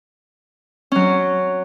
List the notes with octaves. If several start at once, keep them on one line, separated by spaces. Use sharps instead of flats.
F#3 C#4